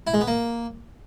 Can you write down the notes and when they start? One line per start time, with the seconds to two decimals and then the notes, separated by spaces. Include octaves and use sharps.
0.07 E4
0.14 G#3
0.21 B3
0.28 A#3